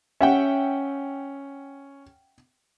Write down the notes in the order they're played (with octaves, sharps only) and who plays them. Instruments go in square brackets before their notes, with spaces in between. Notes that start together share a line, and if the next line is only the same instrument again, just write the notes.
[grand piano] C#4 [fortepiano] E5 F#5 G5